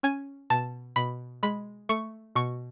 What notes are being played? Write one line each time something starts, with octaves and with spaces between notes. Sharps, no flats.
C#4 G#5
B2 A5
B2 B5
G#3 B5
A3 C#6
B2 C#6